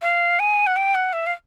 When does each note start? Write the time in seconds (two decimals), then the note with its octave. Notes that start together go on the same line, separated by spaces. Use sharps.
0.02 F5
0.39 G#5
0.67 F#5
0.76 G5
0.95 F#5
1.13 E5
1.26 F5